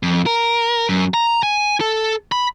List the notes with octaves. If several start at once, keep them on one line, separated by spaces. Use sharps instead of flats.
F2
A#4
F#2
A#5
G#5
A4
B5